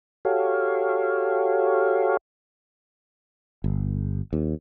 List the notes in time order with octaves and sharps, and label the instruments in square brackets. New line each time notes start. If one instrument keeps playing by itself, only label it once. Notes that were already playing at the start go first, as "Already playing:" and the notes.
[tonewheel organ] F#4 G4 A4 C#5 F5
[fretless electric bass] G1
D#2